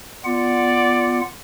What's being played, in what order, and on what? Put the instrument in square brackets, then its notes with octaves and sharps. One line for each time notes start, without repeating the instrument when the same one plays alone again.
[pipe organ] B3 F4 F#5 [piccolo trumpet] D5